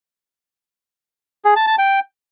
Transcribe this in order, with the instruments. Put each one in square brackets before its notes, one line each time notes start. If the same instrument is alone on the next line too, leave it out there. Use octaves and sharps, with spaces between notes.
[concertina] G#4
A5
A5
G5